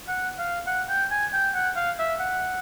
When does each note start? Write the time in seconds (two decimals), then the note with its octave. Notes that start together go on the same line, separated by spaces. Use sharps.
0.09 F#5
0.39 F5
0.67 F#5
0.89 G5
1.11 G#5
1.33 G5
1.54 F#5
1.76 F5
1.99 E5
2.20 F#5